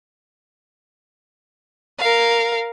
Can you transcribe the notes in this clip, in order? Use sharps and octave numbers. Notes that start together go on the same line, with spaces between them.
A#4 F5